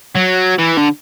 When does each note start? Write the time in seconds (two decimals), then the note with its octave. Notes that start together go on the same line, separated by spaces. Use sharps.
0.16 F#3
0.58 E3
0.77 D3